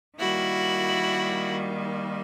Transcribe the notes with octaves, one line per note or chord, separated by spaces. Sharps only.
D#3 G3 A#3 E4 F#4